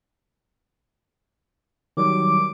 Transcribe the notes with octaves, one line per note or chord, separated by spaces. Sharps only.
D#3 F#3 G3 D6